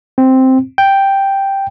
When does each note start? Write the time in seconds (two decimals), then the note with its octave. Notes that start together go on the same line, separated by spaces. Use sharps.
0.18 C4
0.78 G5